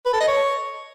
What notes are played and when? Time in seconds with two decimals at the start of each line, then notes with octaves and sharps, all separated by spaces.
0.06 B4
0.13 A4
0.20 D#5
0.28 C#5